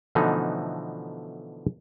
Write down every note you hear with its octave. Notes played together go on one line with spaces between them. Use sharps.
B2 D3 E3 F3 A3 D#4